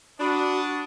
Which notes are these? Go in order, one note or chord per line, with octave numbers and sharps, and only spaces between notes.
D4 F#4 F#5 B5 C#6 D#6